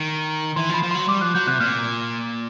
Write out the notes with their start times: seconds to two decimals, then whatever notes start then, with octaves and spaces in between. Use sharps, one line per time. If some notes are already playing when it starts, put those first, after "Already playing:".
Already playing: D#3
0.56 E3 C6
0.70 F3
0.74 B5
0.83 F3
0.91 F#3 C6
1.08 G3 D6
1.21 F3 F#6
1.34 F#3 G6
1.47 C3 F#6
1.60 A#2 F6